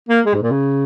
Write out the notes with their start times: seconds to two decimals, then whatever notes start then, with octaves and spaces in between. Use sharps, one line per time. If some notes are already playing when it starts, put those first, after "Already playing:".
0.09 A#3
0.26 G#3
0.34 G#2
0.42 A#2
0.51 C#3